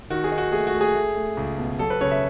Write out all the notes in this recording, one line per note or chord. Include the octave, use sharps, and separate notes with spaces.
D#3 F#4
G#4
D#4
F#4
A3 G#4
F#4
A3
G#4
A3
A3
C#2
B2
F#3 A4
B4
C#3 C#5
E5